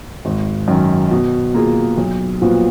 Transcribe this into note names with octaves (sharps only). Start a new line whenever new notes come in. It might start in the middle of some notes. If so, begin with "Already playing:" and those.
G#1
F#2 D#3
B2
A#3 F4 G#4
B1
A#2 F3 B3 F#4